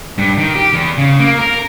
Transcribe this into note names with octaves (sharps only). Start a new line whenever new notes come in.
G2
D#3
G4
E2
C#3
A#3
A#4